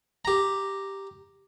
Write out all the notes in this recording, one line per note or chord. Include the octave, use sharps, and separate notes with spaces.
G4 A#5